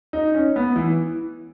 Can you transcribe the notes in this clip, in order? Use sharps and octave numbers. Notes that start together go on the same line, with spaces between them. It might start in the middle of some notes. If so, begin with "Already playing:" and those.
D#4
C#4
B3
E3